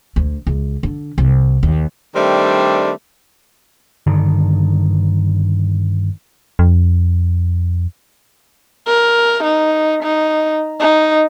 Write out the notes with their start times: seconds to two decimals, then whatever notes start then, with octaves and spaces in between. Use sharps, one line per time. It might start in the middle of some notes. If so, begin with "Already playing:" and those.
0.16 D2
0.47 C#2
0.83 D3
1.18 C2
1.63 D#2
2.15 D#3 G3 A3 C4 D4
4.07 G2 D3 D#3
6.59 F2
8.88 A#4
9.44 D#4
10.03 D#4
10.80 D#4